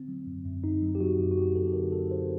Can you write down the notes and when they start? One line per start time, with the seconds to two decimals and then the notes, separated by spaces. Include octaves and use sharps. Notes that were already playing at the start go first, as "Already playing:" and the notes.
Already playing: D3 C4
0.08 F#3
0.27 F#2
0.45 F#2
0.64 F#2 D#4
0.82 F#3
0.95 G4
1.00 F#3 F#4
1.19 F#2
1.32 F#4
1.37 F#3 G4
1.55 F#2 A4
1.74 D3 A#4
1.92 F#3 A4
2.11 F#3 C5